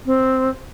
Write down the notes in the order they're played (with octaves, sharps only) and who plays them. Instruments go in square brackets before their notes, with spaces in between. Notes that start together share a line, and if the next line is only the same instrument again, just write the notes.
[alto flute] C4